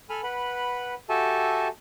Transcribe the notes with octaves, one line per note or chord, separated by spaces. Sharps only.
A4 G#5 B5 F6
B4 F#5 B5
F#4 G4 A4 E5 G#5 A5